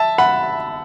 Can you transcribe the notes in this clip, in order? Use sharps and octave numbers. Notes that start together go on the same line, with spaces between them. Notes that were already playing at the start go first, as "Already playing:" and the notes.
Already playing: E5 A5
F#5 B5